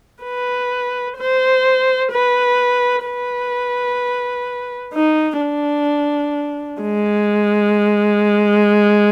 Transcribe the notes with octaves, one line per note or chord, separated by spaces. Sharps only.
B4
C5
B4
B4
D#4
D4
G#3